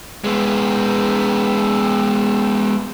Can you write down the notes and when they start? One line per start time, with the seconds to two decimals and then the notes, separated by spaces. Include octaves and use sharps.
0.24 G#3 B3